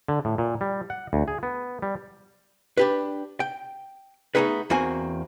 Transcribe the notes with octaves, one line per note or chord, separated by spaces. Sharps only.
D3
A2
A#2
G3
F#5
D2
G#4
B3
G3
D4 G4 B4
G5
A3 B3 C4 D#4 G#4 B4
E2 A#3 C4 F#4 G#5